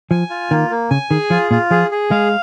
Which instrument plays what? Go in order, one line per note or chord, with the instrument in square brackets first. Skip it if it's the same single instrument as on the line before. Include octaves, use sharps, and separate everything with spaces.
[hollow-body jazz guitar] F3 [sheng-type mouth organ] G#5
[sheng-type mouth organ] F4
[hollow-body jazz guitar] D#3 [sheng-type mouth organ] A#3
[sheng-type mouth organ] A#3
[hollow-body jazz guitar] C#3 [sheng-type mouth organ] G#5
[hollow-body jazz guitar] D#3 [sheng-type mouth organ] G#4
[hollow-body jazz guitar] F3 [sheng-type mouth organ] F4
[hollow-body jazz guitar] A#2 [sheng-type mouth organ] F4
[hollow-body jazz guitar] F3 [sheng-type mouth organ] G#4
[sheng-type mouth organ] G#4
[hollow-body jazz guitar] G#3 [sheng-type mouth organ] F5